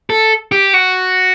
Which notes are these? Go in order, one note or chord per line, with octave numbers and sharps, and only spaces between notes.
A4
G4
F#4